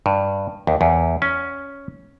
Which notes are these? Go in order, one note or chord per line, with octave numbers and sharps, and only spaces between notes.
G2
D#2
E2
C#4